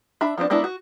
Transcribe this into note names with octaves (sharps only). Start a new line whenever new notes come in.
D4 E5 B5
F3 B3 C4 D4
G#3 A#3 B3 D4 E4
F#4